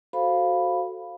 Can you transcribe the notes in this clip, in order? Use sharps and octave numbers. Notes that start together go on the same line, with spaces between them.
F#4 A4 C5 F5 B5